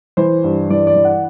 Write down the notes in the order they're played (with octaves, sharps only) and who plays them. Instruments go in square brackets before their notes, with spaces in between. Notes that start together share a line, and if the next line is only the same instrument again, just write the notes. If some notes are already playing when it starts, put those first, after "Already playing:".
[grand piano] E3 C5
G2
E3 D5
D5
E3
F#5